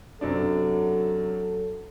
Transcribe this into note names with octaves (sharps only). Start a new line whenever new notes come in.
F#2 C3 F#3 D4 A4